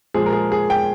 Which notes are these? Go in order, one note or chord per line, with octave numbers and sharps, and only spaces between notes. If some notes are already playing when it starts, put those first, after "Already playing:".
A#2 F3 G#3 G#4
A#4
G#4
G#4
G5